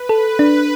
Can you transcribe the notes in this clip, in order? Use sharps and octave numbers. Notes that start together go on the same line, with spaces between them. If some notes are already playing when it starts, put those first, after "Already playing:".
Already playing: B4
A4
D4 B4